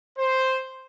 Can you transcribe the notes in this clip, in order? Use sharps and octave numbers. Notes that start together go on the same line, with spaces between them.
C5